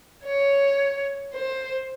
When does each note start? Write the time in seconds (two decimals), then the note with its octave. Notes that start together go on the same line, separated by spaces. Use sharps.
0.25 C#5
1.34 C5